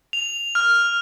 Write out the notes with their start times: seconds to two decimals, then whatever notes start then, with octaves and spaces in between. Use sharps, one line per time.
0.13 F7
0.55 F6